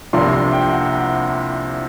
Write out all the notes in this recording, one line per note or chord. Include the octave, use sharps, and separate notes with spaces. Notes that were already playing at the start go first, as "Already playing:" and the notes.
C2 C3 F3 A#3 D4 C6
C6
G5
F#5